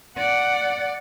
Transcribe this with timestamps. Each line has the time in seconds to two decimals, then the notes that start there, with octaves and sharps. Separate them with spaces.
0.17 D5 F#5